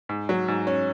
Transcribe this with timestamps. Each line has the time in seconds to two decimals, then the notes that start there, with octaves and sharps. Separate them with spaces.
0.09 G#2
0.29 F#3
0.48 G#2
0.67 C#4